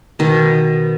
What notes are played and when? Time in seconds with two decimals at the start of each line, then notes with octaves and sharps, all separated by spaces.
0.19 B2 D#3